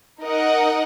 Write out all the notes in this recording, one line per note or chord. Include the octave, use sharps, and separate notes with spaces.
D#4 A#4 D#5 F#5